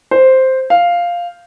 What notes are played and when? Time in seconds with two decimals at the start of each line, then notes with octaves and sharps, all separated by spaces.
0.11 C5
0.70 F5